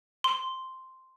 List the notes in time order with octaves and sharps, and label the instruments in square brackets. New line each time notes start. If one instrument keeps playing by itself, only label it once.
[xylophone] C6